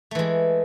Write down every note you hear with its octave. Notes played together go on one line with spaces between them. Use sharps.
E3 G#3 A3